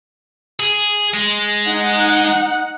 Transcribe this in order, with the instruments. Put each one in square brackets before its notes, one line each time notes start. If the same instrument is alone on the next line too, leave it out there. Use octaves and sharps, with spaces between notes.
[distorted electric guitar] G#4
G#3
[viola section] D#4 F#5